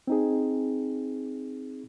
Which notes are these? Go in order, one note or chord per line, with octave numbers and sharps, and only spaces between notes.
C4 D#4 G#4